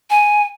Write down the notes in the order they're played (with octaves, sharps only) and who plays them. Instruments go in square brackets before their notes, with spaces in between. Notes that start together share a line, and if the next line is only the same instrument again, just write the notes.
[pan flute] G#5